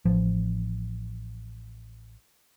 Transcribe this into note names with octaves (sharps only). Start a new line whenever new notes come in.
A1 F3